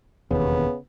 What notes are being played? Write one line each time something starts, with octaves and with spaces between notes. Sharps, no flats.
E1 D#2 C#3 B3